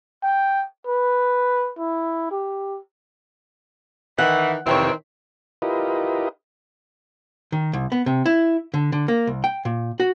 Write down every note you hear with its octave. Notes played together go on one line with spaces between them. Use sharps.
G5
B4
E4
G4
D#3 E3 F#5
F2 C3 D#3 E3 C4 C#5
E4 F4 G4 A#4 B4 D#5
D#3
C2
B3
C3
E4
D3
D3
A#3
C2
G5
A#2
F#4